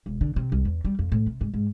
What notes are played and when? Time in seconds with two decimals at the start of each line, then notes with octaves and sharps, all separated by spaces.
0.06 E1
0.21 D3
0.36 C3
0.52 C2
0.65 E2
0.85 G3
0.99 F2
1.12 A2
1.27 C3
1.41 G#2
1.54 G#2